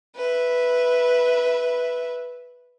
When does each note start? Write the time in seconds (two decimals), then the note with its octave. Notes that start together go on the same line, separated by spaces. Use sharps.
0.17 B4 E5